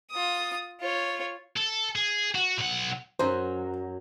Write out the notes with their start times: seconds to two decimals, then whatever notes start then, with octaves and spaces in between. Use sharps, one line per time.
0.11 F4 D#6
0.81 F4 C#5
1.56 A4
1.96 G#4
2.35 F#4
2.58 B1 F#5
3.19 F#2 F#3 C5